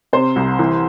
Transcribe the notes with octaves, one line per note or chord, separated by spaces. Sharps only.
C3 C5
C2
E3